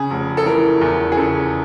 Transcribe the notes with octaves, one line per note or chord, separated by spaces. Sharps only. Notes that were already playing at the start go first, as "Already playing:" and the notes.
Already playing: C#3 G#4
F1
A4
E3 A#4
E2
G#4
C#3 A4